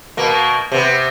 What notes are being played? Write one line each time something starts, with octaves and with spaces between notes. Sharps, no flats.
B2 A#3
C3 B3